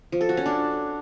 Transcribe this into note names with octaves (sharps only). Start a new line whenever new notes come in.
F3
A4
F#4
C#4
D4